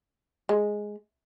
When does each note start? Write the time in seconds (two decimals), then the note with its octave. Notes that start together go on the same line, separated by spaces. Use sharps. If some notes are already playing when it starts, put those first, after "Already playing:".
0.49 G#3